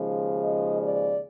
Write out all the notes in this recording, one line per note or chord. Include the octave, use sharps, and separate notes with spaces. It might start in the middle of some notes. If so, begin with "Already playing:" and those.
Already playing: D#2 C#3 F3 G#3
D#5
D5